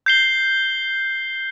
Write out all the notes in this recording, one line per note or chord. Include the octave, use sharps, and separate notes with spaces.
G6 C7 G7